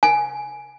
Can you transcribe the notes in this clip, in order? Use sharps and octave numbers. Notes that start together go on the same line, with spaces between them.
G#5